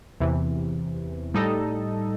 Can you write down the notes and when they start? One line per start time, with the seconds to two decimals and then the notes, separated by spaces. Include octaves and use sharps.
0.20 E2 C3 E3
1.34 A2 G3 D#4 A4 D#5